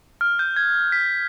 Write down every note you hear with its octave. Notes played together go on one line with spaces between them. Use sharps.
F6
G6
G#6
B6